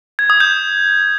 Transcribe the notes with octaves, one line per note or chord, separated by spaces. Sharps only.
G#6
D#6
G6